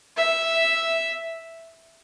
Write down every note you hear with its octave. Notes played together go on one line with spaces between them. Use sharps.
E5